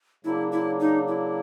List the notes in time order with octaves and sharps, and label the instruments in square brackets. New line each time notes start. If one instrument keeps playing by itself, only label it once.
[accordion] C#3 F#3 A#3 D4 [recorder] E4
[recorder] E4
D#4
E4